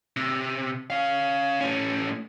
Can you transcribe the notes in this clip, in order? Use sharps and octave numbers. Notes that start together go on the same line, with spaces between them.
C3
C#4 F5
A2 C#4